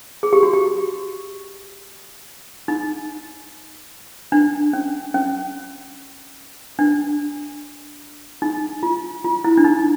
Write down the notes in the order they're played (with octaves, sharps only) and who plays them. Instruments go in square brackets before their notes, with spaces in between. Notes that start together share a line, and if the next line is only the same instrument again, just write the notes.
[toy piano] G#4
G4
F#4
G4
D#4
D4
C#4
C#4
D4
D#4
F4
F4
E4
D4
D#4